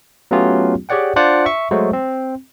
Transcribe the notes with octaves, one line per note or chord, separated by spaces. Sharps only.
F#3 A3 B3 C#4 F4 G4
G4 G#4 C#5 D5 F#5 G5
D4 F4 C5 D5 F#5
E5 C#6
F#3 G#3 A3 F#4 C5
C4